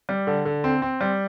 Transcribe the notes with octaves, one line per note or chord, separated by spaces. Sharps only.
G3
D3
D3
C4
C4
G3